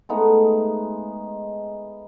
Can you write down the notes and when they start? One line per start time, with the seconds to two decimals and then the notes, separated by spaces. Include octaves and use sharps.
0.09 G#3 A3 B3 D#4